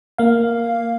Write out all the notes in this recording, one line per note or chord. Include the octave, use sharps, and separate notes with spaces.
A#3 F5